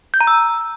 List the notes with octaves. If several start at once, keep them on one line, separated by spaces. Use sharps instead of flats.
G6
A#5
E6